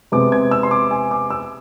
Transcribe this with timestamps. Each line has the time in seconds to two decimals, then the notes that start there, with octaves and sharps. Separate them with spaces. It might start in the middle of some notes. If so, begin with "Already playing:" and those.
0.12 C3 G#3 B3 D6
0.32 G#6
0.51 E6
0.63 C6
0.71 D6
0.91 G#5
1.11 D6
1.30 E6